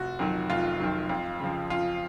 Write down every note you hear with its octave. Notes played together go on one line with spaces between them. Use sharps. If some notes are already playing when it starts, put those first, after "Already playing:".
Already playing: F1 F#4
F2 D#3 F#3
F1 F4
F2 D#3 F#3
F2
C#3 F3
F2 F4